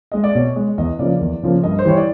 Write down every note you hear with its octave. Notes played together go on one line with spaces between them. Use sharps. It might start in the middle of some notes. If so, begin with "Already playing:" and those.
G#3 D#5
D5
B2 C#5
G#3
E2 D#5
C#3 F3 A#3 D5
E2
C#3 F3 A#3
G2 D#5
C5
E3 G3 C#5
D5